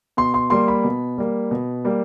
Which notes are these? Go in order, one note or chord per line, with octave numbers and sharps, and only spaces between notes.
B2 C6
C6
G3 A#3 C6
B5
B2
G3 A#3
B2
G3 A#3